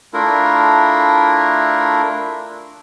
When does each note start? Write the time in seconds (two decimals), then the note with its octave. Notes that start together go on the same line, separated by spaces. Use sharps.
0.14 A3 D4 E4 F4 A#4